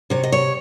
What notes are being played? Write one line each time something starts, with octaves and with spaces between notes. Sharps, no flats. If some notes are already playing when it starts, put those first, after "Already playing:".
C3 C#5
D#5
C#5